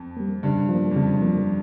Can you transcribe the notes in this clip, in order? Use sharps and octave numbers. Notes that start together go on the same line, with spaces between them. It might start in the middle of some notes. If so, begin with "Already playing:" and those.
Already playing: F2
G3 A#3
G2 C#3
F3 A#3
F2
G2 C#3
F3 A#3